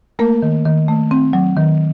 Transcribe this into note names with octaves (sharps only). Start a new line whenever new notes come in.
A3 A#3 A#4
D#3
D#3
A3
C4
F#3
D#3